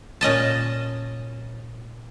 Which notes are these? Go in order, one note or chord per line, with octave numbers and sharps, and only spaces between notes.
A#2 C#4 D#5 A5